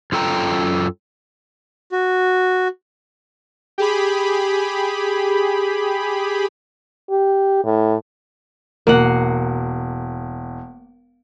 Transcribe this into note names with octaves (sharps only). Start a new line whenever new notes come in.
F#2 F4 A4 G5 A#5
F#4
G4 G#4 B5
G4
A2
E1 A#3 F#5